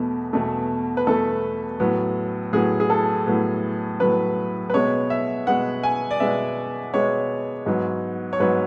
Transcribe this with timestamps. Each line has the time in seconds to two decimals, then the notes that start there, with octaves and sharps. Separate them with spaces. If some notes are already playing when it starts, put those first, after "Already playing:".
Already playing: E2 B2 A3
0.33 E2 B2 A3
0.97 B4
1.07 E2 B2 A3 A4
1.80 A2 F#3 B3
2.53 A2 F#3 B3 G#4
2.80 G#4
2.90 A4
3.27 A2 F#3 B3
4.00 A2 F#3 B3 B4
4.70 B4
4.74 B2 G#3 B3 C#5
5.10 E5
5.47 B2 G#3 B3 F#5
5.83 G#5
6.11 D5
6.20 B2 G#3 B3 E5
6.93 B2 G#3 B3 C#5
7.66 G#2 F#3 B3
8.33 C#5
8.40 G#2 F#3 B3 B4